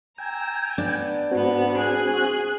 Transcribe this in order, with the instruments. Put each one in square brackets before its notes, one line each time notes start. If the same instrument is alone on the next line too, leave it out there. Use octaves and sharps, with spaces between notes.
[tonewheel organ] G5 G#5 [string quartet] A#5 E6
[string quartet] B3 [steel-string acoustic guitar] D4
[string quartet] G#2 B3 [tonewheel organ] C4 F#4
[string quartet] G#4 G#5 F#6